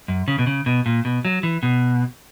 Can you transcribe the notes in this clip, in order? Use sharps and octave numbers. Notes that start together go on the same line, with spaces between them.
F#2
C#3
B2
C#3
B2
A#2
B2
F#3
E3
B2